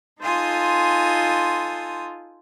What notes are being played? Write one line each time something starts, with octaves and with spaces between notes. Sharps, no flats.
D#4 F4 A4 C5 G#5 D#6